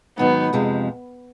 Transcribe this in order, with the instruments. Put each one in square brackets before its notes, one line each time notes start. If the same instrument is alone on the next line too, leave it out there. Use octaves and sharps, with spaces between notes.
[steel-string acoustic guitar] G#2 D#3 F#3 [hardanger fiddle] B3
[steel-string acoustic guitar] F2 C3 F3 G#3